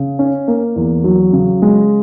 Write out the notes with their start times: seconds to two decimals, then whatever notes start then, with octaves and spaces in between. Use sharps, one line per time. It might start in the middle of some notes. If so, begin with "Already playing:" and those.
Already playing: C#3
0.19 C#4
0.48 A#3
0.76 E2
1.04 F#3
1.33 C#3
1.62 G#3